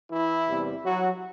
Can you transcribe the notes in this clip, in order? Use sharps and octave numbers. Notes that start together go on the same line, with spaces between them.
E3 E4
E2 C3 G3 B3
F#3 F#4